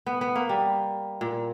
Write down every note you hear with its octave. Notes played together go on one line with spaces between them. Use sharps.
B3
B3
A#3
G3
A#2